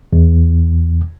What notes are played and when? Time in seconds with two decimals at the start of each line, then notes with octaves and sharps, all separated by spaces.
0.13 E2